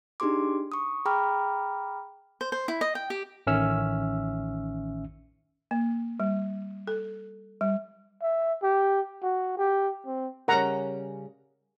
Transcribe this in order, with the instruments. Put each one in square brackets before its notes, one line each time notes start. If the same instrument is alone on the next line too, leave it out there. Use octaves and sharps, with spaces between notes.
[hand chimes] D4 D#4 G4 G#4 C6 D6
C#6 D#6
G#4 G5 A#5 B5 D6 F6
[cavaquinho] C5
C5
E4
D#5
G5
G4
[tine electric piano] A1 D#3 C#4 E5 E6 F6
[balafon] A#3
G3
A4
G3
[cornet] E5
G4
F#4
G4
C4
[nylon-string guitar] C#3 G3 C#4 [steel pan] A#4 F#5 A#5